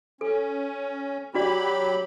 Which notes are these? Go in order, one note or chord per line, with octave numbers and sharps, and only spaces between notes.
C#4 A4
F#3 D4 F#4 G4 D5 B5